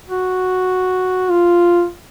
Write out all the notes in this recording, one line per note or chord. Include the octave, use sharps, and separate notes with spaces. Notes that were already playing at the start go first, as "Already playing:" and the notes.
F#4
F4